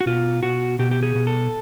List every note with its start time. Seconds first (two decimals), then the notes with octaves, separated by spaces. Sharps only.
0.01 F#4
0.06 B2 F4
0.43 B2 F#4
0.79 B2 G4
0.91 G4
1.03 G#4
1.15 B2
1.27 A4